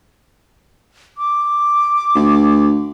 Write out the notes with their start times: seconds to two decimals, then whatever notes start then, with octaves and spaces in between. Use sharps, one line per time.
1.18 D6
2.15 D2